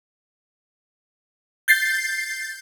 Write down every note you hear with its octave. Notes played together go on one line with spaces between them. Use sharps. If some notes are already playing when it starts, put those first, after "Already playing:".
G6 A6 C7